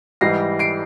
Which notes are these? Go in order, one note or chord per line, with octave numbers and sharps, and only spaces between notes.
G#2 E3 G3 A#6 C7
C7 D7